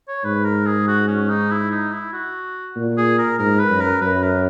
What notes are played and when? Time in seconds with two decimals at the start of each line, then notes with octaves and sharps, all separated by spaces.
0.08 C#5
0.24 G#2 B4
0.45 A#4
0.66 G#4
0.87 F#4
1.08 C#4
1.29 D#4
1.51 E4
1.70 D#4
1.92 E4
2.13 F#4
2.76 A#2
2.97 G#4
3.18 A#4
3.39 G#2 A#4
3.59 B4
3.70 F#2
3.81 A#4
4.01 F#2 B4
4.23 A#4